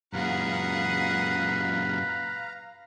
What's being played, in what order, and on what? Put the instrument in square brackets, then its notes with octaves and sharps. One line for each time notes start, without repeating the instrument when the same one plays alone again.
[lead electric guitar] F#2 A#2 [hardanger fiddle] G#4 F#5 [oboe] B4 [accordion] F5 A#5